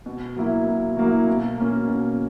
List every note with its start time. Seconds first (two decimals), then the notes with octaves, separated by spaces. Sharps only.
0.06 B2
0.36 F#3 A#3 E4
0.67 B2
0.97 F#3 A#3 E4
1.28 B2
1.58 A#3 C#4
1.88 B2